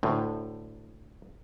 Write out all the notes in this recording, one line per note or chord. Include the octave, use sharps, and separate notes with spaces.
D2 A2